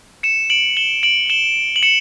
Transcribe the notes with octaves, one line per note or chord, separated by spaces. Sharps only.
C#7 E7
D7 F#7
E7 G7
D7 F#7
E7 G7
F#7
C#7 E7